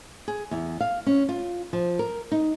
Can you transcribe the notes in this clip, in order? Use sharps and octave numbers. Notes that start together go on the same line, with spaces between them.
G#4
E2
F5
C#4
F4
F3
A#4
D#4